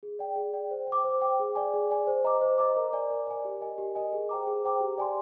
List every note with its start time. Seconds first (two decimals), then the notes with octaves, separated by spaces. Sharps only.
0.03 G#4
0.19 D5 G5
0.36 G#4
0.53 D5 G5
0.71 C5
0.87 G5
0.92 D6
1.04 C5
1.21 G5 D6
1.40 G#4
1.55 D5 G#5
1.74 G#4
1.90 D5 G#5
2.07 C5
2.24 D#5 A#5 D6
2.41 C5
2.58 D#5 A#5 D6
2.76 A#4
2.93 D5 G#5
3.10 A#4
3.27 D5 G#5
3.45 G4
3.61 A#4 D#5 G#5
3.78 G4
3.95 A#4 D#5 G#5
4.13 G#4
4.29 C5 G5 A#5 D6
4.47 G#4
4.64 C5 G5 A#5 D6
4.81 G4
4.98 D5 G#5 C6